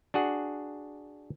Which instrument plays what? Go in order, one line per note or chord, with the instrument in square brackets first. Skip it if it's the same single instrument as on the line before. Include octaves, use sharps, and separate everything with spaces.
[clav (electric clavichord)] D4 F#4 G#4 F#5